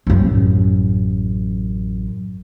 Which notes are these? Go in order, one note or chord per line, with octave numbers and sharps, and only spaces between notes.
A1 F#2